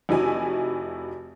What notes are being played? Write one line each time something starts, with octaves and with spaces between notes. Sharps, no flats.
F1 D#4 E4 F#4 G#5